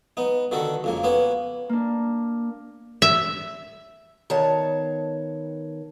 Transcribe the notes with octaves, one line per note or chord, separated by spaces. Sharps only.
B3 D#4
D3 D#3 F#4 A4
F2 C#3 A#3
A#3 B3 C#4 B4
A#3 D4
E5
D#3 B3 C#5 A5